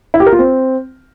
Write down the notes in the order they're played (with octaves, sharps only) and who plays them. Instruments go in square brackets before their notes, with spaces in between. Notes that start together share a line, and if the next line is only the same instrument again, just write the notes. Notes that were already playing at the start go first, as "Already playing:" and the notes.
[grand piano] E4
G4
A#4
F4
C4